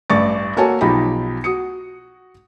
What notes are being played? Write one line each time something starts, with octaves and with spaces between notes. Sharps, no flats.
A1 G2 D5 C#6 D6 A6
A#3 F#4 A4 C#5 G#5 A5
B1 F3 D#4 G4 B5
F#4 D#6 C#7